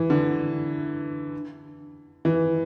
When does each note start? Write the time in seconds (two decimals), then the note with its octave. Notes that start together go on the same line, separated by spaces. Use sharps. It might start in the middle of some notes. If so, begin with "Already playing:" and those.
Already playing: E3
0.10 D3
2.25 E3